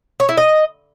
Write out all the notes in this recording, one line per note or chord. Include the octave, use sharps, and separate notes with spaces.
C#5
E4
D#5